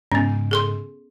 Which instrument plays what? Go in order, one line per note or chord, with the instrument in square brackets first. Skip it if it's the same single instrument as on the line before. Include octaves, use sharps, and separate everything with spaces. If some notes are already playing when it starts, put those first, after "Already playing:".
[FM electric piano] G#2 C#3 [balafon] B3 C#4
[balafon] G#4 A4 C6